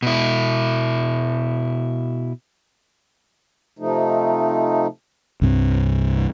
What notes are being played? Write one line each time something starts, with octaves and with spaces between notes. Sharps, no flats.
B2 E4
C3 F3 A3 D#4
C2 G2 C4